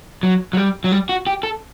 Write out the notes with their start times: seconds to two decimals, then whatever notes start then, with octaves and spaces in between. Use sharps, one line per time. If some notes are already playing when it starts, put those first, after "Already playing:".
0.23 F#3
0.53 F#3
0.57 G3
0.84 F#3
0.92 G3
1.09 F#4
1.27 G4
1.43 A4